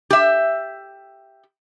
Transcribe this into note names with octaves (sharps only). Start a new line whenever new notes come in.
G4 E5